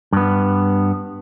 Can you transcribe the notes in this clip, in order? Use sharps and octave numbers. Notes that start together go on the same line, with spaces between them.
G2 B3